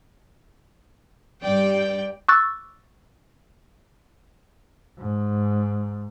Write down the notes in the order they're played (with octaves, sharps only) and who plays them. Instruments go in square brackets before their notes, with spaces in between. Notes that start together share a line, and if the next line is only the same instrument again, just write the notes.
[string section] G2 G5 [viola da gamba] G3 D5
[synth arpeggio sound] C#6 D6 E6 F#6 A6
[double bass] G#2